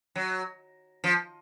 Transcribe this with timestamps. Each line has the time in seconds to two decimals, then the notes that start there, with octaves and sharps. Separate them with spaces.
0.16 F#3
1.04 F3